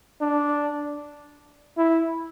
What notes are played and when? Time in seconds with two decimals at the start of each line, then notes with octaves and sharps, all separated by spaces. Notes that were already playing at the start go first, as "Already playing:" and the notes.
0.21 D4
1.77 E4